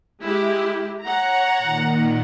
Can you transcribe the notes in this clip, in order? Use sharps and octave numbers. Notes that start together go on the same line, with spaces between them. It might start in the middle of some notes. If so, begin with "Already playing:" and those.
G#3 E4 G4
C#5 F#5 A#5
A#2 D#3